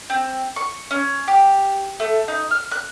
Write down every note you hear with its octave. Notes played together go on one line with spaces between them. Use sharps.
C4
C#6
C#4
G4
A3
D#4
F6
F#6